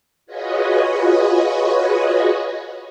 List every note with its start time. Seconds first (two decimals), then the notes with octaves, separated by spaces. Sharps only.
0.26 F4 F#4 G#4 B4 C#5 D#5